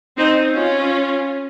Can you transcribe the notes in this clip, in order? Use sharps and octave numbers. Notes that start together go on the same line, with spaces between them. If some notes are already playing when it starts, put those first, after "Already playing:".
C4 D#4
C#4 F4